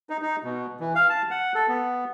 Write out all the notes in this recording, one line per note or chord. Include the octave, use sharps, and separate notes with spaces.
D#4
D#4
B2
E3
F5
A5
F#5
A4
B3